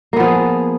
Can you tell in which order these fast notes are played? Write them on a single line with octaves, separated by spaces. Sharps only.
A#3 B3 F3 G#4